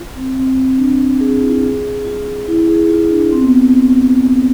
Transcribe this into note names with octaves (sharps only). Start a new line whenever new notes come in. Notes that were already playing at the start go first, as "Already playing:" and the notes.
Already playing: F4
C4
C4
C4
D4
G#4
F4
E4
F4
G#4
F4
E4
G#4
F4
D4
C4
B3
C4